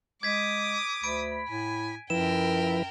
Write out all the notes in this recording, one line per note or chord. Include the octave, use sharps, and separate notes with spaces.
G#3 D6 D#6 G#6 B6
D2 B5 D7
A2 G#5
F#2 F3 E4 A#4 B4 G5 E7